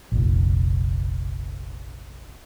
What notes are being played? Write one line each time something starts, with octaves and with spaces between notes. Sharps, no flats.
F1 A#1